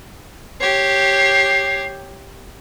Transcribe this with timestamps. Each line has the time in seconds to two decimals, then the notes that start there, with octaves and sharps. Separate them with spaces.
0.60 G4 C#5 C7